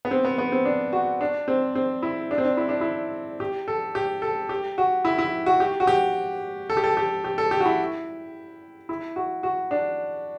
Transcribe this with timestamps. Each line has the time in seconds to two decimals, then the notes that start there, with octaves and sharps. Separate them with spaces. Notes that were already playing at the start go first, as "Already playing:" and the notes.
0.05 B3
0.11 C4
0.25 B3
0.38 B3
0.52 C4
0.65 D4
0.93 F#4
1.21 D4
1.48 C4
1.75 C4
2.03 E4
2.31 D4
2.38 C4
2.45 D4
2.57 E4
2.69 D4
2.81 E4
3.40 G4
3.68 A4
3.95 G4
4.22 A4
4.49 G4
4.78 F#4
5.05 E4
5.18 E4
5.46 F#4
5.60 G4
5.80 F#4
5.87 G4
6.70 A4
6.77 G4
6.84 A4
6.97 G4
7.24 G4
7.38 A4
7.51 G4
7.60 F#4
7.65 E4
8.89 E4
9.16 F#4
9.43 F#4
9.71 D4